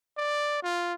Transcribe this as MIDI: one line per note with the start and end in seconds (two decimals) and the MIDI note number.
0.18 0.62 74
0.63 0.94 65